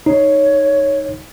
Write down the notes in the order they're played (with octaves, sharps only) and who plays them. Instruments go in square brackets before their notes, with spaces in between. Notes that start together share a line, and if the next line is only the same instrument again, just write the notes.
[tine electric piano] D#4 [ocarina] C#5